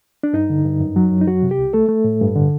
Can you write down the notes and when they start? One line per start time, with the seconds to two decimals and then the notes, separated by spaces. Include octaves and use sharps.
0.23 D4
0.33 G2 D#4
0.50 D3
0.65 G2
0.80 F#2
0.96 F#3
1.11 F#2
1.21 D#4
1.27 F#3 F#4
1.43 C3
1.51 G4
1.58 C2
1.73 A3 A4
1.89 A3
2.04 A2
2.21 G2
2.36 D3